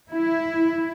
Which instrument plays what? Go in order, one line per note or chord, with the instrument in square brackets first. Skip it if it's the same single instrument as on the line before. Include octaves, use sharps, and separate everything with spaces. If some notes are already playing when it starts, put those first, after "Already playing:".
[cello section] E4